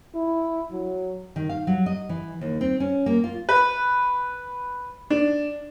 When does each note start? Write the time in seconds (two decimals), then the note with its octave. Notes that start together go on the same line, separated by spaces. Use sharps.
0.15 E4
0.72 F#3
1.36 D#3
1.49 F5
1.67 F#3
1.86 D#5
2.09 E3
2.41 D#2
2.61 C4
2.80 C#4
3.06 A#3
3.24 F4
3.49 B4
5.10 D4